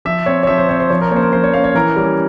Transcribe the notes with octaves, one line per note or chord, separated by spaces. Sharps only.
F3 E5
C4 C#5
C#5
F3 E5
C5
C4 C#5
C5
F3 C#5
A#4
A#3 C#4 C5 C#5
A#4
F3 C5
C#5
A#3 C#4 F5
C#5
E3 A#4
G3 C#4